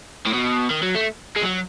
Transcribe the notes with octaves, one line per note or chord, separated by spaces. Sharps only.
A2
B2
D#3
F#3
A3
G#3
F#3